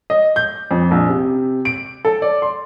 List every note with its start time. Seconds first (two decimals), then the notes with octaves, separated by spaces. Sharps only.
0.10 D#5
0.36 G6
0.71 F2
0.91 A#1
1.09 C3
1.65 D7
2.05 A4
2.22 D5
2.42 C6